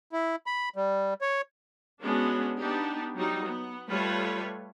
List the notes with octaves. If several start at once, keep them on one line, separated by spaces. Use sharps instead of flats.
E4
B5
G3
C#5
G#3 B3 C#4 D4 F#4
B3 D4 D#4 G4
F#3 G3 D#4 F#4
B3
G3 A3 F4 B4 C#5